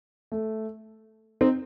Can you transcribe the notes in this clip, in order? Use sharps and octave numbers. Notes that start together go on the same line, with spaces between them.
A3
C4 D#4